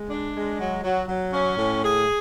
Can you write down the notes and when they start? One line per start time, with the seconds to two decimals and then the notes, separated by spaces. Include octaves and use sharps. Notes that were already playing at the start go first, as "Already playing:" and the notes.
Already playing: G#3
0.10 D4
0.35 G#3
0.59 F#3
0.84 F#3
1.08 F#3
1.33 C#4
1.58 A2
1.83 G#4